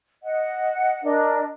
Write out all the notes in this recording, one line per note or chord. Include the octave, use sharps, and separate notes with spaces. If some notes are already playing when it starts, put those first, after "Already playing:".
D#5 F#5
D4 A#4 D#5